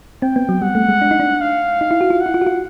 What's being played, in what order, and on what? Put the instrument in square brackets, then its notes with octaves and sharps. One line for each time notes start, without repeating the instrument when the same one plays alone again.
[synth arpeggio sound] C4 [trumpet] G5
[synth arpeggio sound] B3
F#3
[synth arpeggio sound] G3 [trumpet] F#5
[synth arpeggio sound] A3
G#3
D4
D#4
D4
[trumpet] F5
[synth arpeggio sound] D#4
E4
F#4
F4
[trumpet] F#5
[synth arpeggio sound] E4
F4
F#4
F4